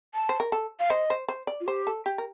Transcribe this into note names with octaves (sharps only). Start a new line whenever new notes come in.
A5
C5
A#4
A4
F5
C5 D#5
C5
C5
D5
F4
G4 C5
A4
G4
A#4